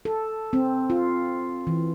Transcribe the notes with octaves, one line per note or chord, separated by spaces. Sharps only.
A4
C4
F4
E3